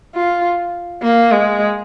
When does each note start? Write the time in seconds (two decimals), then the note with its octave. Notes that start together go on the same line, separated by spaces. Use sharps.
0.15 F4
1.03 A#3
1.32 G#3